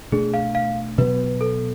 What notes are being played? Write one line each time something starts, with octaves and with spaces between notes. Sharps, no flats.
B2 A3 D4 G#4
F5
F5
B2 F#3 B3 B4
A4